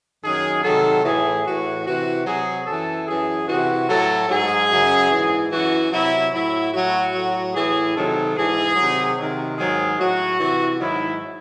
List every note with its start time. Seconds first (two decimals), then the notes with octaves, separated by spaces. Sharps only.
0.23 F#2 D#3 F#3 G#4
0.63 C3 D#3 F#3 A4
1.04 A2 E3 G#4
1.46 A2 E3 F#4
1.85 C3 E3 F#4
2.26 C3 F#3 G#4
2.66 F#2 E3 A4
3.07 F#2 E3 G#4
3.48 C3 E3 F#4
3.89 A2 F#3 A4
4.29 G#2 F#3 G#4
4.70 F#2 C#3 F#3
5.11 G#2 E3
5.51 F#2 E3 F#4
5.92 C3 F#3 E4
6.33 A2 F#3 E4
6.73 A2 F#3 F#4
7.13 A2 F#3
7.54 A2 E3 G#4
7.96 C3 D#3 F#3 A4
8.36 G#2 E3 G#4
8.76 C3 D#3 F#3
9.17 C3 D#3 F#3
9.58 G#2 D#3 F#3 G#4
9.99 A2 F#3 F#4
10.39 C3 E3
10.80 G#2 D#3 F#3 E4